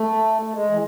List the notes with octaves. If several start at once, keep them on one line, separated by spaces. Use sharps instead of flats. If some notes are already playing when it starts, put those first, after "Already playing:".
Already playing: A3
A3
G#3
E3